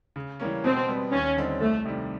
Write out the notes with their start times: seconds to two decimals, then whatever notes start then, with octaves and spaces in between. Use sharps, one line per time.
0.16 C#3
0.40 E3 G3 A#3 C#4
0.64 B2 C4
0.88 G3 B3
1.12 D#2 C#4
1.37 D3 G3 C4 D#4
1.60 C2 A3
1.85 C3 D#3 G3